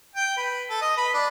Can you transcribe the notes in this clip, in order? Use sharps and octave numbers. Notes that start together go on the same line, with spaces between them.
G5
B4
A4
D#5
B4
D4